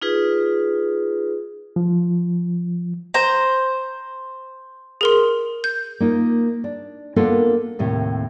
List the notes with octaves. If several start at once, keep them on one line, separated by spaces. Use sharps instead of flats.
D#4 F4 G#4 B4
F3
C5 A#5
G#4 A#4 C6
G6
A#3 D#4 F4
D4
A#3 B3 D4 F4 A4 A#4
D#2 A2 C3